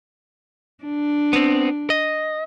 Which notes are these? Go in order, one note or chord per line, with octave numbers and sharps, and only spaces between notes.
D4
B3 C4
D#5